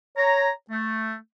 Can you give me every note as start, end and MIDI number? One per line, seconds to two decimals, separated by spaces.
0.17 0.49 73
0.17 0.49 82
0.70 1.15 57